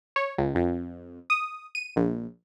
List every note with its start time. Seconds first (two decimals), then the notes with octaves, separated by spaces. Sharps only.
0.16 C#5
0.38 C#2
0.55 F2
1.30 D#6
1.75 D#7
1.96 A#1